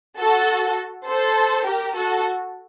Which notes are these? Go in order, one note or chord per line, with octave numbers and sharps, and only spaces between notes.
F#4 A4
A4 C5
G4 A#4
F#4 A4